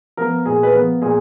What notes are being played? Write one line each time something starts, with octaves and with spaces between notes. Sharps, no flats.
F3 B3 A#4
A#2 G#4
B4
F3 B3 A#4
A#2 G#4